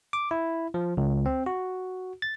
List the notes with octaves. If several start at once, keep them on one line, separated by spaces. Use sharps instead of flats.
D6
E4
F3
C#2
C4
F#4
A6